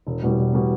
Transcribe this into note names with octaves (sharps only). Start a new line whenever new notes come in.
E1
E2 B2 G3
E1
B2 G3